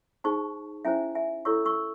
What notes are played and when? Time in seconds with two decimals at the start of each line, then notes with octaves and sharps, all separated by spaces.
0.24 D#4 G#4 C5 A5 C#6
0.85 C#4 E4 C5 E5 G#5
1.15 E5 G#5
1.45 E4 A4 C#5 C#6 E6
1.65 C#6 E6